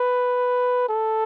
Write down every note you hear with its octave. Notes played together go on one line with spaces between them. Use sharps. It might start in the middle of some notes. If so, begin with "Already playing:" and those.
Already playing: B4
A4